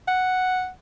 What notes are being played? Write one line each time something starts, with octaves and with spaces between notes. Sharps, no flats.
F#5